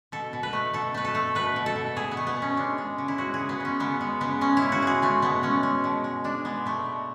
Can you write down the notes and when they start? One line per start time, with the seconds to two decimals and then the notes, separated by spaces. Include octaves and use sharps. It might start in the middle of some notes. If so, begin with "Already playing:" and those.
0.12 B2 A4
0.33 B2
0.43 B4
0.53 A3
0.74 B2 A4
0.94 A3 B4
1.05 A4
1.15 A3
1.35 B2 B4
1.56 B2
1.66 A4
1.76 B2
1.96 B2 G#4
2.11 B3
2.17 A3
2.27 B3
2.37 B2
2.42 C#4
2.57 G#3 D4
2.78 G#3
2.98 C#3
3.08 E4
3.18 G#3 F#4
3.34 G#4
3.39 C#3
3.49 B3
3.60 G#3 C#4
3.80 C#3 B3
4.01 G#3
4.21 C#3 B3
4.41 G#3 C#4
4.57 E4
4.62 C#3
4.72 F#4
4.82 G#3 G#4
5.02 G#3 A3
5.22 B2 B3
5.43 G#3 C#4
5.63 G#3
5.84 B2
6.04 G#3
6.24 G#3 D4
6.45 G#3 B3
6.66 B2 A3
6.86 B2